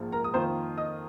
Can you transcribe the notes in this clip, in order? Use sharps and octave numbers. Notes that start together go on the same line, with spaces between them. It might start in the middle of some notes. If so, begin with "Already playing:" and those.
Already playing: A#1 G#2 F3 A#3
A#4 A#5
D#6
F2 D#3 A#3 F4 C5 C6
D#5 D#6